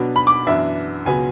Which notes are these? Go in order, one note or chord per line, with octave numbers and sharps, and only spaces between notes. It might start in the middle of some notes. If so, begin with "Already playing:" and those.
Already playing: B2 F#3 B3 D4
B5
D6
F#2 E3 B3 D4 E5
C#2 B2 F#3 B3 G#5